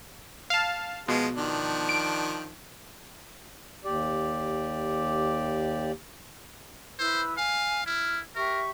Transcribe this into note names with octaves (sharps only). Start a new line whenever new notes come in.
F5 A5
B2 F3 G#3 F4
D#3 F3 D4
D7
D#2 G4 D5
E4 B4 C5 E6
F5 G#5
E4 F6
G4 A#4 E5 C#6